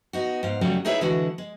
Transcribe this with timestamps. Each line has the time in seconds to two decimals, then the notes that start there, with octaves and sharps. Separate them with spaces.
0.13 B3 D#4 F#4
0.43 G#2 F5
0.61 F#2 C#3 F#3 G3 A3 F4
0.85 D#4 E4 G#4 B4 C#5 E5
1.01 D3 E3 G#3 F#4
1.38 G#3